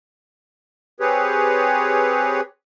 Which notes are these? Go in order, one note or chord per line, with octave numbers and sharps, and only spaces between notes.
C4 G4 G#4 B4 C#5